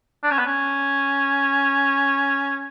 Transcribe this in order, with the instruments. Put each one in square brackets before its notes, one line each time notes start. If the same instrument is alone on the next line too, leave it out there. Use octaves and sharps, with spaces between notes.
[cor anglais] D4
C#4
B3
C#4